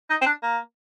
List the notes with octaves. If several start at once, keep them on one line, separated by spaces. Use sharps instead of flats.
D#4
C4
D4
A#3